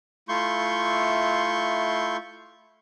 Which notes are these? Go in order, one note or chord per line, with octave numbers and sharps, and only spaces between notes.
A3 E4 F4 C6 C#6 G6